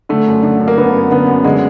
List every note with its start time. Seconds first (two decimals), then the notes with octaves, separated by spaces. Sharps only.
0.09 D3 A3
0.27 F#2
0.43 D3
0.60 F#2
0.68 A#3
0.77 D3 B3
0.94 F#2
1.10 D3 B3
1.27 F#2
1.44 D3 G#3